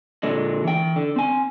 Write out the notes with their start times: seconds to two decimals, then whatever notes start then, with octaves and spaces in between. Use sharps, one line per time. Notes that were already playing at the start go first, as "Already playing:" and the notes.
0.23 A#2 D3 G#3
0.64 E3 G5
0.96 D3
1.16 C4 G#5